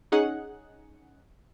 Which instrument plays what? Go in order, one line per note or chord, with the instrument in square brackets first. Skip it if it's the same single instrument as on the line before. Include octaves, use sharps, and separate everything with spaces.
[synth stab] C#4 D#4 G#4 F#5